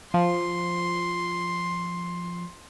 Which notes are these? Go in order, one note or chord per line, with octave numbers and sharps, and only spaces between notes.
F3 C6